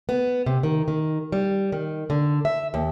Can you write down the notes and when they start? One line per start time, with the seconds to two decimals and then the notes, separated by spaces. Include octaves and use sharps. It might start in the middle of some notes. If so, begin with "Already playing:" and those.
0.09 B3
0.46 C3
0.63 D#3
0.88 D#3
1.32 G3
1.72 D#3
2.10 D3
2.45 E5
2.74 D#2